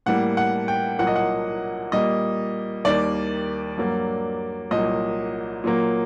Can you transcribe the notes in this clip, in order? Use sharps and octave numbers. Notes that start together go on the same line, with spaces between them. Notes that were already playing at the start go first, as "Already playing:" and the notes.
A2 G3 A#3 F#5
F#5
G5
C2 A#2 F#3 A#3 F#5
D#5
F#5
A#2 G3 A#3 D#5
D#2 D#3 G3 A#3 D5
G2 F#3 A#3
C2 A#2 F#3 A#3 D#5
A#2 F#3 A#3